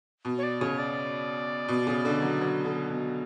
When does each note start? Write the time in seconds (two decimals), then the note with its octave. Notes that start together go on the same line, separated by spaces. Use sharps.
0.25 B2
0.38 C#5
0.43 D5
0.61 C#3 C#5
0.78 D5
1.68 B2
1.87 C#3
2.05 D3
2.22 F#3
2.41 F#3
2.65 D3
2.89 B2